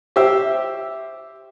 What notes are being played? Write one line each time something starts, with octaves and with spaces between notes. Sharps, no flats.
G4 C5 E5 E6